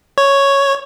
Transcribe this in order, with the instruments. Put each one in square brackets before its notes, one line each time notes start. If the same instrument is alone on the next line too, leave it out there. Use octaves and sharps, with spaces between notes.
[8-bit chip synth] C#5